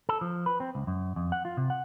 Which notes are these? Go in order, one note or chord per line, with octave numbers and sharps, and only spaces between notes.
A4
F3
B4
C4
C#2
F#2
F2
F#5
F4
C3
F#5